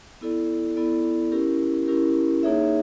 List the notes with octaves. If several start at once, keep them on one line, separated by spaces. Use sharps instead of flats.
B3 E4 A4 D5
B3 E4 A4 D5
C#4 E4 G4 A#4
C#4 E4 G4 A#4
A#3 D#4 G#4 C#5 E5